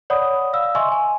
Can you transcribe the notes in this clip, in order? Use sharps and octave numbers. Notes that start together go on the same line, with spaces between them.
C#5 D5 F#5 B5 D#6
F5 E6
D#5 E5 G#5 C6 C#6 E6
G#5